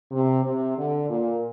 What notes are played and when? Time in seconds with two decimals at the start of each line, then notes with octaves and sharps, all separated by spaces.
0.11 C3
0.44 C3
0.77 D3
1.09 A#2